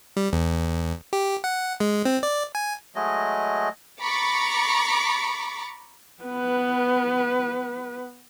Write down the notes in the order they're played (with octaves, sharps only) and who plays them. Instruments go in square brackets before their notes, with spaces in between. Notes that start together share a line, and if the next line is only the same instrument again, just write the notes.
[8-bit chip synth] G3
E2
G4
F#5
G#3
C4
D5
G#5
[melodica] F#3 G#3 A3 D#5
[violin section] A#5 B5 C#6 D6 A6 C#7
[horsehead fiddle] B3 B4